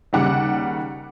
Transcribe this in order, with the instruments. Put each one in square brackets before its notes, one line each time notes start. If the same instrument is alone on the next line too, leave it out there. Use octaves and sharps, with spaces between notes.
[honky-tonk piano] D#2 C#3 G3 F#5 D6 F#6